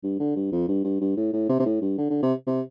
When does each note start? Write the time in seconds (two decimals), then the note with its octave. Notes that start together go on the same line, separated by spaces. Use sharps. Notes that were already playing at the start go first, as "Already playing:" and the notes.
0.03 G2
0.20 D3
0.36 G2
0.52 F2
0.68 G2
0.84 G2
1.01 G2
1.17 A2
1.33 A2
1.49 C3
1.59 C3
1.66 A2
1.82 G2
1.98 D3
2.10 D3
2.23 C3
2.47 C3